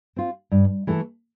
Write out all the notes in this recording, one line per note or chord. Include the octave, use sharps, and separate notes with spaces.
C4 F4
G2
E3 A3 E4 A4